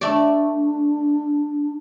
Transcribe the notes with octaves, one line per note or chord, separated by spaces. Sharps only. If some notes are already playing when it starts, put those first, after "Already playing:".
A3 D4 D5